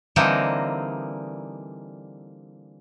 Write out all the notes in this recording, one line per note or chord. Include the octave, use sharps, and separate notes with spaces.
D3 E3 G3 A#3 C4 D#4